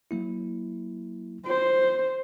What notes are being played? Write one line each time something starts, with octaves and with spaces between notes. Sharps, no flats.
F#3 A#3 E4
F4 C5